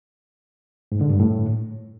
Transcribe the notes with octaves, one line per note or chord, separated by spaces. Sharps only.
G#2
D3
G2
A2